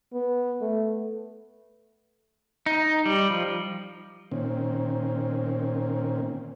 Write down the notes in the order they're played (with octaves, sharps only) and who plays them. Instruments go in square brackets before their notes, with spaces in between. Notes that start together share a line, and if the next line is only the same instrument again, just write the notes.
[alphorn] B3
A3
[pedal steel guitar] D#4
G3
F3
[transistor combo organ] A#2 D#3 C4 C#4